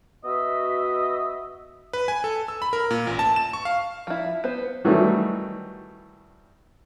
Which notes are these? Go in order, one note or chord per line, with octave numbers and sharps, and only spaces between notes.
B3 F#4 D#5 E5
B4
G#5
A4
E6
B5
A#4
A#2
A1
A5
E7
C#6
F5
F3 E4
B3 C5
D#3 E3 F#3 G3 A3